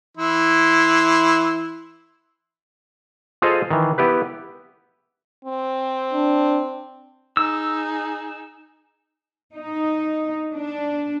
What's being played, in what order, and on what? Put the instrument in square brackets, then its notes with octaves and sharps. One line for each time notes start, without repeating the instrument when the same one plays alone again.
[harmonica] E3 E4 C6
[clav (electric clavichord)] F4 G#4 A4 C5 D#5 F5
D#3 E3
B3 E4 G4 B4
[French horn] C4
[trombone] D4
[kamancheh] D#4 G#4 [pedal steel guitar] E6
[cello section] D#4
D4